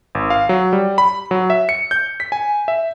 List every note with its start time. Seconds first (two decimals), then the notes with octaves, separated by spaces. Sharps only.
0.15 G#1
0.30 F5
0.49 F#3
0.73 G3
0.98 B5
1.31 F#3
1.50 E5
1.69 C#7
1.91 G6
2.20 B6
2.32 G#5
2.68 E5